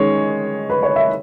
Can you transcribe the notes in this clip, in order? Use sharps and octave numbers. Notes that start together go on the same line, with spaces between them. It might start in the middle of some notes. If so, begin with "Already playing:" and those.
Already playing: D#3 G#3 C#4 C#5
B4
C#5
E5